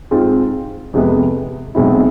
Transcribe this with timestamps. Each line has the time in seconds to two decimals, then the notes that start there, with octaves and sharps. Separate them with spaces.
0.11 G#2 G#3 C4 F4
0.94 F2 C3 G#3 B3
1.75 B1 B2 G#3 C4 E4